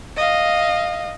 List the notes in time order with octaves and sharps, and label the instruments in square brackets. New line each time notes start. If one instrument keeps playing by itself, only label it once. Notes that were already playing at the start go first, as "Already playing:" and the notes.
[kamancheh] D#5 F5